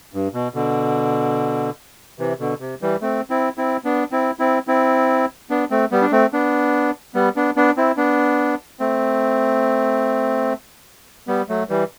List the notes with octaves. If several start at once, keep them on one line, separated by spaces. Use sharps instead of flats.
G2
B2
B2 D3
C3 E3
B2 D3
C3
E3 G3
A3 C4
C4 E4
C4 E4
B3 D4
C4 E4
C4 E4
C4 E4
B3 D4
A3 C4
G3 B3
D4
A3 C4
B3 D4
G3 B3
B3 D4
B3 D4
C4 E4
B3 D4
A3 C4
G3 B3
F#3 A3
E3 G3